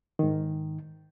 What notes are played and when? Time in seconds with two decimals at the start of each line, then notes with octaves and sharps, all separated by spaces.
0.19 G#2 D#3